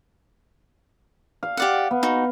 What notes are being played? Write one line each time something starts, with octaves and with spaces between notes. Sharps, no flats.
F5
G4 D5 F#5
B3
D#4 F#4